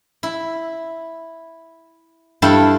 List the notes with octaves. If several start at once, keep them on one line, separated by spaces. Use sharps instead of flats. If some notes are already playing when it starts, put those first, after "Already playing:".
E4
G2 E4 A4 F5 G5